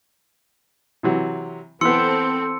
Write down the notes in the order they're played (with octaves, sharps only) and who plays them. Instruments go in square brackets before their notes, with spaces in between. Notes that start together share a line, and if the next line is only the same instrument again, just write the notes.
[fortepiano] C3 E3 F#3
[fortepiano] E3 B3 [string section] C4 A4 [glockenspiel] C6 E6 C#7